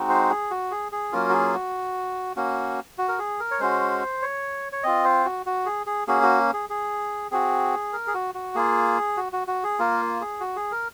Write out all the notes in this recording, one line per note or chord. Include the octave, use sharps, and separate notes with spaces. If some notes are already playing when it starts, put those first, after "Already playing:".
Already playing: G#3 C4 D#4 F#4
C5
G#4
F#4
G#4
G#4
F#3 A#3 C#4 F4 A#4
F#4
G#4
F#4
A#3 C#4 F#4
F#4
A#4
G#4
A#4
C#5
G#3 C#4 F#4 C5
C#5
C#5
C4 F4 D#5
C5
F#4
F#4
G#4
G#4
A#3 C#4 F#4 G#4
F#4
G#4
G#4
C4 F#4 G#4
A#4
G#4
F#4
F#4
A#3 F4 G#4
F#4
F#4
F#4
G#4
A#3 F4 A#4
G#4
F#4
G#4
A#4